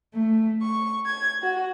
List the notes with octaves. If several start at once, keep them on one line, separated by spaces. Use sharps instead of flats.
A3
C#6
G#6
F#4